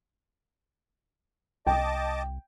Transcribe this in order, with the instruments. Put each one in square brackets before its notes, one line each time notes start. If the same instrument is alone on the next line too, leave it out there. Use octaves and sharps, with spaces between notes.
[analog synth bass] C2 [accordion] D#5 A5 D6 [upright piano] G5